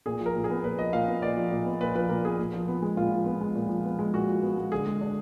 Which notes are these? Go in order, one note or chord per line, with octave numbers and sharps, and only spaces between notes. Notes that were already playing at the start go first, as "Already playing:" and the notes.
A#2 G#4
F3
A#4
A#2
G#4
B3
A#2 B4
F3 D#5
A#2 F5
B3
A#2 D5
F3
A#2
B3
A#2 B4
F3 B4
A#2 A#4
B3 G#4
A#2
F3
B3
G#3
A#2 F4
F3
B3
G#3
A#2
F3
B3
G#3
A#2 F#4
F3
B3
G#3
D3 G#4
G#3
D4